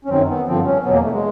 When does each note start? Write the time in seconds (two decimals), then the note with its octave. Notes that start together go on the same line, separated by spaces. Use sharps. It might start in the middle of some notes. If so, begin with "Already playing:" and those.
0.05 C#4
0.09 F#2 D#3 F#3 C4
0.28 B3
0.47 G2 D3 F3 C4
0.65 C#4
0.84 E2 B2 F#3 B3
0.93 A#3
1.02 A3
1.12 G#3